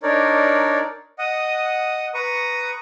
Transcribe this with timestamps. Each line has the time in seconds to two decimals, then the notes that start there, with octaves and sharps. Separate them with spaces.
0.03 D4 D#4 A#4 C#5 D5
1.19 D#5 F#5 D#6
2.14 B4 A#5 C#6 D#6